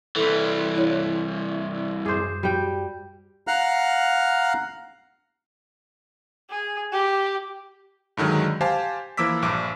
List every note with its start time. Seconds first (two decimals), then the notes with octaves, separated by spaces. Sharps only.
0.16 C2 E3 A4
0.76 E4 C#5
2.06 F#2 G#4 C5 D6
2.43 G3 F#4 G5
3.47 F5 F#5 A#5 F6 F#6
6.50 G#4
6.92 G4
8.17 G2 D3 D#3 F#3 G#3
8.61 G4 C5 F5 G#5 A5
9.17 E3 F3 A#3 D6 E6 B6
9.42 A#1 G2 D6